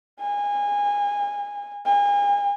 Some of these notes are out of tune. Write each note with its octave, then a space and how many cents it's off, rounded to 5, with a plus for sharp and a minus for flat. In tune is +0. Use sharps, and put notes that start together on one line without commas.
G#5 -25
G#5 -40